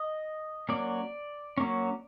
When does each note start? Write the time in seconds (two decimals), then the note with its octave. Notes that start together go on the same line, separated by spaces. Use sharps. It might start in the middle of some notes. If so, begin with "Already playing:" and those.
Already playing: D#5
0.69 F#3 A#3 C#4 D5
1.58 F#3 A#3 C#4